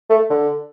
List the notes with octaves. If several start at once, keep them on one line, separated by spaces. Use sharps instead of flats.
A3
D3